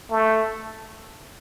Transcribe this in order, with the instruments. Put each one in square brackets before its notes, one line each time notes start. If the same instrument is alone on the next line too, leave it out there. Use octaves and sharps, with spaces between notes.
[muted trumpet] A3